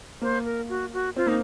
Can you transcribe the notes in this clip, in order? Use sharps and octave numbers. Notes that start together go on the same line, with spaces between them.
A#3 C5
A#4
F#4
F#4
C4 F4
A#3 D#4